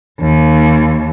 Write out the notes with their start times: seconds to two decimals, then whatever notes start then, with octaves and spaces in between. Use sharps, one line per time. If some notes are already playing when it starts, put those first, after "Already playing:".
0.21 D#2